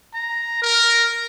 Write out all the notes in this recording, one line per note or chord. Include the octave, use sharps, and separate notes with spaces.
A#5
A#4